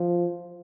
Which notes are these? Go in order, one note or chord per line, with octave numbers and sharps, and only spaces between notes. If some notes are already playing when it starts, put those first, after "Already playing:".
Already playing: F3